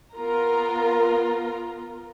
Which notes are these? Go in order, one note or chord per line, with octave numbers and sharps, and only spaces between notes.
B3 F4 A#4 A#5